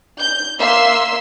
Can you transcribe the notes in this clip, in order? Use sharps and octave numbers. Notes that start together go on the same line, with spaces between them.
G6
A#3 E5 C6 E6